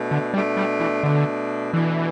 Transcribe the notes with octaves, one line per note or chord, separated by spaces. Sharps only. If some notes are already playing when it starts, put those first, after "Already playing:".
Already playing: B2 A3 D4
D3
B2 G3 A3 D4
G3
E3
B2 D3 A3 D4
B2 E3 A3 D4